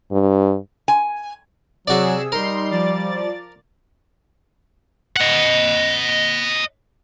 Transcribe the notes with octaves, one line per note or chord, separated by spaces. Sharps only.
G2
G#5
C3 F#3 F#4 G#4 D5 E6
G3 D#4 A#4 C6 C7
F3 D5 A6
D#5 F#5